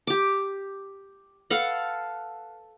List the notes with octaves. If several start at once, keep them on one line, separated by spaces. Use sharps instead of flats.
G4 D6
A4 B4 F5 F#5